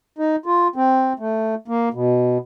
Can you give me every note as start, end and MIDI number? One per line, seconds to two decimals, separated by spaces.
0.18 0.36 63
0.46 0.68 65
0.76 1.13 60
1.19 1.55 57
1.68 1.89 58
1.94 2.38 47